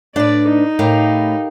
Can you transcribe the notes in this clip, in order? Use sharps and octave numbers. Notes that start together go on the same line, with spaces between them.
A2 D4 B4 D5
D#4
A2 G4 A#4 F5